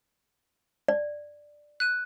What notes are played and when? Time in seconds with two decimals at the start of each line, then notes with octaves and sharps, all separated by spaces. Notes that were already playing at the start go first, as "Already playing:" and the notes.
0.88 D5
1.80 F#6 D#7